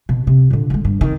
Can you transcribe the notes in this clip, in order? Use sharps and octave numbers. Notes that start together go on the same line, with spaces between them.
B2
C3
A#2 D3
D3 G#3
G2
D#3 C4